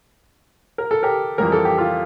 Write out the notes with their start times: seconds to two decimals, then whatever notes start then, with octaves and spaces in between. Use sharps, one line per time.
0.78 A#4
0.91 A4
1.03 G4 A#4
1.38 F2 E3 G3 A#3 A#4
1.52 A4
1.65 G4
1.77 F4 A4